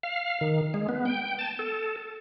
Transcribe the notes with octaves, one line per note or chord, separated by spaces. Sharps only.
F5
D#3
G#3
B3
G5
A5
A4